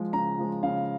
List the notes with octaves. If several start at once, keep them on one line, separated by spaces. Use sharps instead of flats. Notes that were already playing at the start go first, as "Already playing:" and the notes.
Already playing: F3 G#3
C#3 A#5
F3 G#3
C#3 F5